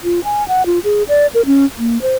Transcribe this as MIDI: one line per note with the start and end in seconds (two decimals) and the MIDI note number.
0.04 0.23 65
0.24 0.46 80
0.48 0.66 78
0.66 0.79 65
0.84 1.03 68
1.08 1.27 74
1.34 1.45 70
1.46 1.65 61
1.78 2.00 58
2.02 2.16 72